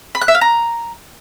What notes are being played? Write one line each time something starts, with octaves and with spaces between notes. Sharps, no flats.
B5
F#6
E5
F5
A#5